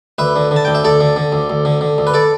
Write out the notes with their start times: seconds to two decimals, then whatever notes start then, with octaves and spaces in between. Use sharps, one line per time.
0.18 D2 B4 E5
0.36 D3
0.51 D3
0.56 A5
0.65 D2 G5
0.75 E5
0.84 D2 A4 D5
1.00 D3
1.16 D3
1.32 D2
1.50 D2
1.65 D3
1.81 D3
1.98 D2
2.07 B4
2.14 A4 D5